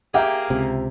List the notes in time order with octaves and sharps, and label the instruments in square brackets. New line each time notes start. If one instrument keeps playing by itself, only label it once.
[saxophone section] A#3 G#4 [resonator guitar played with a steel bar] G4 [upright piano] E5 A#5
[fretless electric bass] C#2 C3